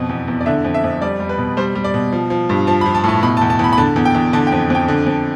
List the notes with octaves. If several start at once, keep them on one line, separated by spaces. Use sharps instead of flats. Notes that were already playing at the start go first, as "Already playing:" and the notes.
Already playing: F2 B2
E2
E2
D5
D3 E5
F2
E5
F2
G3 D5
G3
B4
B2
G3 C5
G3
D5
B2
F3
F3
G2
F3 A5
B5
F3
A5
A2
A5
B2 B5
A5
E2
A5
E2 B5
B5
D3 A5
E2
G5
E2
D3 A5
G5
F2
F2 G5
D3
F2